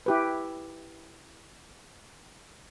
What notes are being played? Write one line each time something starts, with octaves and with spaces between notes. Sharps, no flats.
E4 G4 B4